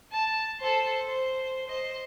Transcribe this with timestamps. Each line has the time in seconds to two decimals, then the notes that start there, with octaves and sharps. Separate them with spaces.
0.12 A5
0.60 A4 C5
1.06 C5
1.67 C5 D#5